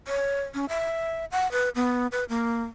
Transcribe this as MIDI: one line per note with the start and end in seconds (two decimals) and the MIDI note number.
0.08 0.42 73
0.54 0.66 61
0.69 1.25 76
1.32 1.50 78
1.52 1.69 71
1.75 2.07 59
2.12 2.24 71
2.29 2.64 58